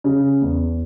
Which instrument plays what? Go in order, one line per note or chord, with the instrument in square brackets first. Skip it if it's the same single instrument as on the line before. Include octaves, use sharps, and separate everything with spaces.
[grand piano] C#3
E2